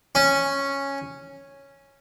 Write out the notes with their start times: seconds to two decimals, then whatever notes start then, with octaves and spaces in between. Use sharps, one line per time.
0.15 C#4